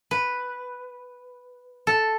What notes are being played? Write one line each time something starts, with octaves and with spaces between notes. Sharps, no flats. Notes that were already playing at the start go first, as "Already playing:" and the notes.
B4
A4